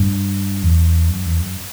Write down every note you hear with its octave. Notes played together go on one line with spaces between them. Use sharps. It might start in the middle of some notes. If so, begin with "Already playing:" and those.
Already playing: G2
E2
F#2
E2
F#2